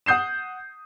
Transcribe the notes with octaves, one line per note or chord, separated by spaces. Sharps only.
F#5 D#6 G6 C7 E7